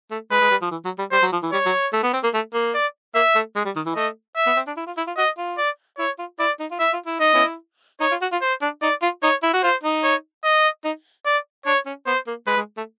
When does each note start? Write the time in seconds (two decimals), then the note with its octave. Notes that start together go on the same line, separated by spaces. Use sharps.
0.11 A3
0.31 G#3 B4
0.41 G#3
0.51 G3
0.61 F3
0.71 E3
0.85 F#3
0.99 G3
1.12 G3 C5
1.22 F#3
1.32 F3
1.43 E3
1.52 G3 C#5
1.66 F#3
1.93 A3
2.03 B3
2.13 C4
2.23 A#3
2.34 A3
2.54 A#3
2.74 D5
3.15 A#3 E5
3.35 A3
3.56 G#3
3.65 G3
3.76 D#3
3.86 E3
3.95 A3 D#5
4.36 E5
4.46 B3
4.56 C4
4.67 D4
4.77 E4
4.86 F4
4.97 E4
5.07 F4
5.17 F#4 D#5
5.37 F4
5.58 D5
5.98 E4 C#5
6.18 F4
6.39 E4 D5
6.59 D#4
6.71 F4
6.79 E4 E5
6.93 F4
7.06 E4
7.20 D#4 D#5
7.34 B3 C#4 E4
8.00 D#4 C#5
8.11 F4
8.21 F#4
8.32 F4
8.42 C5
8.62 D4
8.82 D#4 D5
9.02 F4
9.23 D#4 C#5
9.43 E4
9.53 F#4
9.63 F4 C5
9.83 D#4
10.03 C#5
10.44 D#5
10.85 D#4
11.26 D5
11.66 D4 C#5
11.86 C#4
12.06 B3 C5
12.27 A#3
12.47 G#3 B4
12.57 G#3
12.77 A3